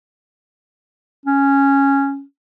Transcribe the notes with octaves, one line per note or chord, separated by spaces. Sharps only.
C#4